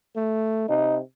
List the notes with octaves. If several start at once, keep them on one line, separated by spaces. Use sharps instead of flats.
A3
C3 D#4